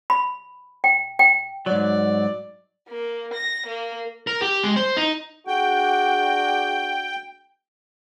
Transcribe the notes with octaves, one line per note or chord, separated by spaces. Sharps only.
B5
G5
G5
G#2 F#3 D5
A#3
A#6
A#3
A#4
G4
G#3
C5
D#4
D4 F#4 G#4 G5